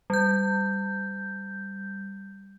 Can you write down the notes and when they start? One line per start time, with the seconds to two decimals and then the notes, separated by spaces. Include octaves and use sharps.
0.10 G3 G6